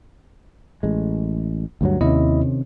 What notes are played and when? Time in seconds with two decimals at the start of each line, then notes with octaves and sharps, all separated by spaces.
0.83 A1 G#3
1.81 D2 G2 F#3
2.01 D#2 C3 D#3 C#4 E4 D#5